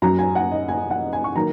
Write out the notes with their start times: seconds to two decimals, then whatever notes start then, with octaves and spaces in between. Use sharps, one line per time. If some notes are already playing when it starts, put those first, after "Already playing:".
0.02 F#2 F#3 C#4 A#5
0.19 G#5
0.35 F#5
0.52 D#5
0.68 G#5
0.90 F#5
1.13 G#5
1.24 C#6
1.35 D#3 F#3 A#3 A#5